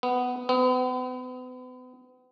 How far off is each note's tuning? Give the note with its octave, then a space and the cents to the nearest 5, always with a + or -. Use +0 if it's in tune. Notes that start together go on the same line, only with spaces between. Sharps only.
B3 +10
B3 +40